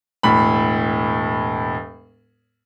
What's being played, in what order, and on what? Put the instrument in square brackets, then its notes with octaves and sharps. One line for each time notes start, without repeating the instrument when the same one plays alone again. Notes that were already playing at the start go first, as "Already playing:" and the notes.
[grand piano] E1 A2 B5